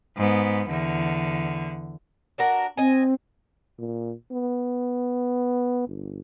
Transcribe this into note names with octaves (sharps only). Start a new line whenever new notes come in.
G#2 B3
E2 D3
D4 F#4 A#4
C4 D#5 G#5
A#2
B3
G1